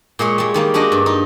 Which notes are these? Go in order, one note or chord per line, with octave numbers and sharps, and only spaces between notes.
A#2 G#3 G#4 C#5
G3 G#3
D#3 G3 A#3
G#3 D4 F#4 G4 D#5
G2
D#4